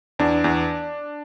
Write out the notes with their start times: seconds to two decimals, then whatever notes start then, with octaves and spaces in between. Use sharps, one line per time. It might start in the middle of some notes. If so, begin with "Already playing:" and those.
0.19 E2 D4
0.44 E2